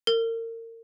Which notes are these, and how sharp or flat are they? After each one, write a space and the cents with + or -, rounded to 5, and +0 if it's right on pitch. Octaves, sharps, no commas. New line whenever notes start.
A#4 -35